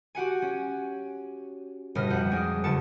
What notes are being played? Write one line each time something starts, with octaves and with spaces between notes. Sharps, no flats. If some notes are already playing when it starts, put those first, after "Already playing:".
F#4 G4 F#5 G#5
C#4
G1 B2 F6 A#6 D#7
F2 F#5 G6
G#3 D4 G#4
F#1 D3 A5 C#7